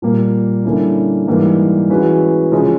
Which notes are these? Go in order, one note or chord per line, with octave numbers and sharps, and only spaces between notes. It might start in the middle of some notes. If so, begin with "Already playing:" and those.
A#2 G3 A#3
D3 G3 A#3 C#4 E4
G#2 E3 G3 A#3
E3 G#3 C#4 F#4 B4
C#3 F3 G#3